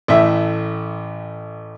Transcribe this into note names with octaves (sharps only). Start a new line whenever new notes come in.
A1 A2 E5